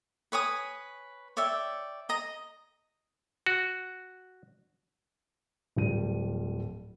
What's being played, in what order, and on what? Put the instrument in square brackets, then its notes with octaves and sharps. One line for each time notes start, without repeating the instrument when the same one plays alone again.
[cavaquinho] B4 C#5 G#5 D#6
C#5 D5 E5 G5
D#5 A#5
[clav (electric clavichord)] F#4
[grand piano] D1 F3 G3 D#7